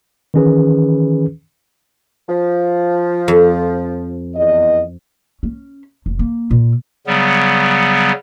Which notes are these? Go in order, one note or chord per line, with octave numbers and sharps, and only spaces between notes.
D#3 E3 C#4 G#4 B4
F3
F2
E2 D#5
C#4
F1
A#3
A#2
C#3 F#3 G3 B3